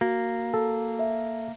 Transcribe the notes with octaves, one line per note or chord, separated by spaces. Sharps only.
A#3 F#4
A4
E5